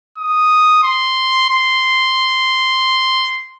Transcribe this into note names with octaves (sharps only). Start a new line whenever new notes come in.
D#6
C6
C6